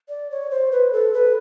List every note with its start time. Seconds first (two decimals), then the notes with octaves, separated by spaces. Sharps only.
0.09 D5
0.31 C#5
0.51 C5
0.72 B4
0.93 A4
1.13 B4